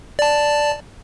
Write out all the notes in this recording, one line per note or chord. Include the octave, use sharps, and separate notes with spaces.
D5 A5